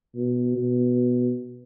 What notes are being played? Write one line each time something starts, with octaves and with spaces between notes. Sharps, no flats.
B2
B2